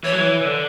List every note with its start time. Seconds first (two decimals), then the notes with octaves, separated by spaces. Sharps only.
0.04 E3 C#5
0.12 F#3
0.19 E3
0.41 E3
0.45 D3